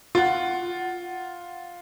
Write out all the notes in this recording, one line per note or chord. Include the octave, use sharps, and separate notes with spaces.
F4 F#5